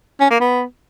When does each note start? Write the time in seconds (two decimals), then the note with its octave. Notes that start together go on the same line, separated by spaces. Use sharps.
0.20 C#4
0.30 A#3
0.40 B3